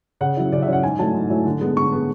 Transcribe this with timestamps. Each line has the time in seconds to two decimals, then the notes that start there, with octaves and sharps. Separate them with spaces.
0.21 C#3 F#5
0.37 F#3 C#4 E4
0.52 C#3 D5
0.62 E5
0.68 F#3 C#4 E4 F#5
0.83 G#2 G#5
0.99 F#3 A3 E4 A5
1.15 G#2
1.30 F#3 A3 E4
1.46 D3
1.61 G#3 B3
1.77 D3 C#6
1.92 G#3 B3